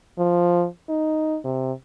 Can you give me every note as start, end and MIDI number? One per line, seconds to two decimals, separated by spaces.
0.19 0.65 53
0.89 1.38 63
1.44 1.73 48